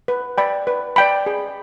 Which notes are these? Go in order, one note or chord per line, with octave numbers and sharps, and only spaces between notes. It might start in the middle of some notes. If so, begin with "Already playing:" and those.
B4
D5 G5 B5
B4
D5 G5 B5
G#4